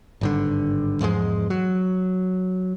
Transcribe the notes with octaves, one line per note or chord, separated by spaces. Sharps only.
G#1 G2 D3
E2 G#2 F3 G#3
F#3